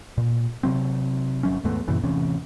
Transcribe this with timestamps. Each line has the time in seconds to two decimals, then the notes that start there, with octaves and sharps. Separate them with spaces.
0.18 A#2
0.63 C3 F#3 C4
1.43 G1 F#3 C#4
1.64 D#2 G#2 A3 B3
1.88 F#2 A#2 C#3 E3
2.04 A1 E2 C3 C#4